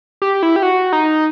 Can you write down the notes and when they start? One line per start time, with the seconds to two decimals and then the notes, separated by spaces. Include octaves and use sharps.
0.22 G4
0.43 E4
0.56 G4
0.63 F#4
0.93 D#4